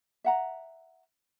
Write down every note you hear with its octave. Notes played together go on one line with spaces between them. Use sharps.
E5 F#5 A#5